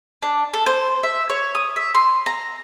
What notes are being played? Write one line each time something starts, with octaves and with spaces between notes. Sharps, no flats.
D4
A4
C5
E5
C#5
D#6
E5
C6
A#5